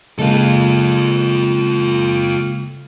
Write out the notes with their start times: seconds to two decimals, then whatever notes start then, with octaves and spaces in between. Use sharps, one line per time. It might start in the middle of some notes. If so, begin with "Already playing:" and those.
0.19 C#3 G#3 A#3 F4 A4